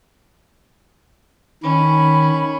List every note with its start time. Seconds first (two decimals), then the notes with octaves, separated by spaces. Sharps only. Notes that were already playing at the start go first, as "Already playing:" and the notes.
1.63 D#3 C#4 B5